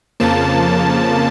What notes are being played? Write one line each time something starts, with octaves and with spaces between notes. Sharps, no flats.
F2 C#3 F3 A#3 A5